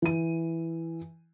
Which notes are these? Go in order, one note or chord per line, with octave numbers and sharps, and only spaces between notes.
E3 D#7